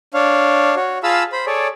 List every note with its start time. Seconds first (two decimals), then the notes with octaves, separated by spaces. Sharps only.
0.14 D4 C#5 F5
0.76 F#4 C#5
1.03 F4 G#4 F5 A5 B5 E6
1.32 C5 B5
1.46 G#4 A4 C#5 D5